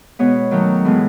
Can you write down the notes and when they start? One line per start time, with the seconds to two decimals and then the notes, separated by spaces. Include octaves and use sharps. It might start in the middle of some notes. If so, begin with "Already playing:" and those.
0.19 B2 G#3 B3 C#5
0.51 D#3 F#3 A3
0.85 A2 E3 G#3 B3